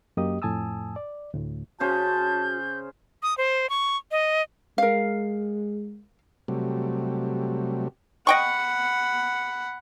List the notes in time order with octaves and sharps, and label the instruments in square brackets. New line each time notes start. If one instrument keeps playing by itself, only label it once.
[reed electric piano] F#2 A#3 G4 D#5 D#6
F2 A2 G#5 A5 D#6 E6
D5
D2 A2
[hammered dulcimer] C#3 C#4 C5 [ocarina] F#4 [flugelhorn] A5 [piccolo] G6
[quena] D#6
C5
C#6
D#5
[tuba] G#3 [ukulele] A#4 F5
[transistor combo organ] C3 F#3 G3 A3
[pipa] D#5 G5 C#6 [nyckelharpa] F#5 B5